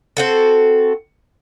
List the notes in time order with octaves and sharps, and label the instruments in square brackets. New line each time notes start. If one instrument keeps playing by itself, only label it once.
[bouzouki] C4 F#4 A4